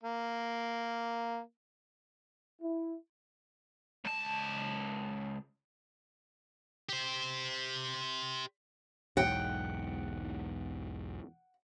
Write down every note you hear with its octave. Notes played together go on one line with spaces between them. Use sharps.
A#3
E4
C#2 A5
G4 C5
B1 E2 G#2 F#5 G5